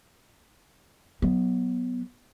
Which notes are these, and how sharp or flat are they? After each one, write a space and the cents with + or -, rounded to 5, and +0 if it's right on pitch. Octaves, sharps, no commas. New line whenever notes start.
F#3 +0 B3 +0